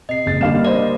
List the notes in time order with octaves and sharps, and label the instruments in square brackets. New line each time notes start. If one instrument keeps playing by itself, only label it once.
[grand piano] C3 [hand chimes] D#5 C7
[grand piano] F#1 A6
[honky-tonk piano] D3 F5 E7 [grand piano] G3 A#3
[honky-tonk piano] C5 D#5 [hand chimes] D5